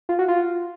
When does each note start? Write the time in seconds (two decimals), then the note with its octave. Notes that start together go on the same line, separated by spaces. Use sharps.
0.09 F4
0.19 F#4
0.28 F4